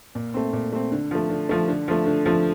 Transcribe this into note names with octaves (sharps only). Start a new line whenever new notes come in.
A#2
A3 C4
A#2
A3 C4
D3
F3 A3
D3
F3 A3
D3
F3 A3
D3
F3 A3